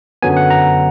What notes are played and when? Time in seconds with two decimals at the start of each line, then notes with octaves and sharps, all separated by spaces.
0.22 F#2 D3 F#3 B3 G#5
0.37 F#5
0.50 A#5